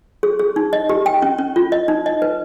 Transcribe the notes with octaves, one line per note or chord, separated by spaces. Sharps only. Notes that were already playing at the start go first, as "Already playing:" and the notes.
G#4
G#4
D#4
D#5
G4
G5
C#4
C#4
F4
D#5
D#4
D#5
B4